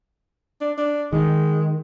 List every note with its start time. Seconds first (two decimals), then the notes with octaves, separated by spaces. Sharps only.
0.61 D4
0.78 D4
1.13 D#3 G#3